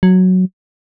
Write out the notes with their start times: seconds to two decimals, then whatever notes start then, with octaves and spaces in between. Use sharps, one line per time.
0.03 F#3